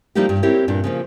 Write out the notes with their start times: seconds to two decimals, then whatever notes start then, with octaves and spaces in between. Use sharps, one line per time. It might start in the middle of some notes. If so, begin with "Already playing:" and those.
0.15 F3 G3 A#3 D#4 E4 G4
0.29 G2
0.43 C4 E4 G4 A#4 C#5
0.68 G2 A#2 D4
0.84 C#3 F3 A#3